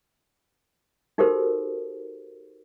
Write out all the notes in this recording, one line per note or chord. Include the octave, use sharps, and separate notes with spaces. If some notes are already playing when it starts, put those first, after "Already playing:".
D#4 F#4 G4 A4 A#4 C5